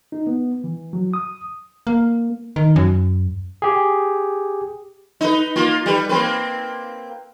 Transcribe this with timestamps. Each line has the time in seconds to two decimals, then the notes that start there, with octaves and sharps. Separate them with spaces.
0.12 D#4
0.27 B3
0.64 E3
0.93 F#3
1.14 D#6
1.87 A#3
2.56 D#3
2.76 F#2
3.62 G4 G#4
5.21 D#4 B4
5.56 A#3 F4
5.86 G3 B4
6.09 A#3 C4 B4